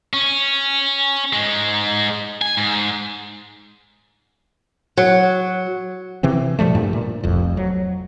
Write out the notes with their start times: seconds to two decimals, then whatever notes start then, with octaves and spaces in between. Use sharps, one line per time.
0.14 C#4
1.33 G#2 G#3
2.42 G#5
2.57 G#2
4.97 F#3
6.23 C3 E3 C4
6.59 B2 F3 G3 A3
6.75 G2 A#2
6.93 A#2
7.24 F1 C2 F2
7.57 F#3